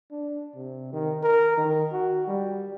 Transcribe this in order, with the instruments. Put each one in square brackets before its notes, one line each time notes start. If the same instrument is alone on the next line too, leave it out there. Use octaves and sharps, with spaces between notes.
[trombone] D4
C3
D#3
A#4
D#3
F#4
G3